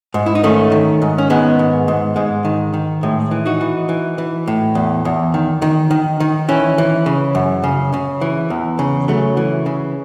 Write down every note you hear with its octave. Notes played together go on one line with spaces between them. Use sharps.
G#2
E4
D#4
D#3 A3 C#4
D#3
G#2
C#4
D#3 G#3 B3
G#2
G#2
G#2 G#3
D#3
D#3
A2 G#3
E3
D#4 F#4
E3
E3
E3
A2
E2
E2
D#3
D#3
D#3
D#3
E3 C#4 E4
E3
C#3
F#2
C#3
C#3
E3
E2
C#3
C#3 F#3 A3
E3
C#3